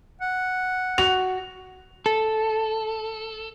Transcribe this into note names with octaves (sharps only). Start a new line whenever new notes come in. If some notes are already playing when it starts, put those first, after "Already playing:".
F#5
F#4 F7
A4